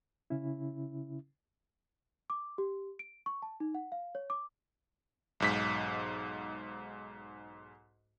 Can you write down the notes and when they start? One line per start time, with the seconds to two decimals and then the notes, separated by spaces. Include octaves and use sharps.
0.30 C#3 C#4 E4
2.30 D6
2.58 G4
2.99 D7
3.26 C#6
3.42 A5
3.60 D#4
3.75 F#5
3.92 F5
4.15 C#5
4.30 D6
5.40 B1 G#2 B6